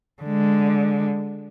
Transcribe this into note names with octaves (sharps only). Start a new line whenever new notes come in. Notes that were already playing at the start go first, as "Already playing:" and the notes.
D3 G#3